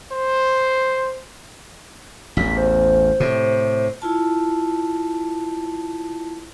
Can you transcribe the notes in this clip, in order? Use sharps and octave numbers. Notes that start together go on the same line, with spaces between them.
C5
A1 E2 B6
C5
A2 C3
E4 F4 A5